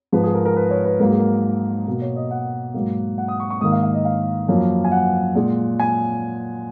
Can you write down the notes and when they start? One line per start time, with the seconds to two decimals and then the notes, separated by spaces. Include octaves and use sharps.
0.13 G#2 F3 G#3 B4
0.24 G#4
0.34 A#4
0.45 A#4
0.56 B4
0.71 C#5
0.85 B4
1.00 G#2 F#3 A#3 A#4
1.10 G#4
1.19 A#4
1.87 B2 A#3
2.02 C#5
2.16 D#5
2.31 F#5
2.74 G#2 F#3 A#3
3.18 F#5
3.28 D#6
3.40 C#6
3.50 C#6
3.61 G#2 D#3 A#3 D#6
3.72 F5
3.83 F5
3.94 D#5
4.05 F5
4.49 F#2 F3 A#3
4.84 G#5
4.92 F#5
5.35 A#2 G#3
5.79 G#5